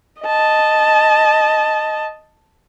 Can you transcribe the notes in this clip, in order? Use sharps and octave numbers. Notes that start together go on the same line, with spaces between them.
D#5 A5